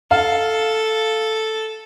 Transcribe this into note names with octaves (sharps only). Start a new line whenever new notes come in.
A4 F5